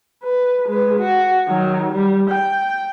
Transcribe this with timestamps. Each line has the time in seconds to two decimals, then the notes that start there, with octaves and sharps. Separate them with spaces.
0.24 B4
0.69 G#3 B4
0.99 F#4
1.48 D#3 F#3
1.92 G3
2.30 G5